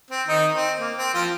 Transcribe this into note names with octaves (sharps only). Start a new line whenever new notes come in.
C4
D#3 D#4
C4
A#3
C4
F3 F4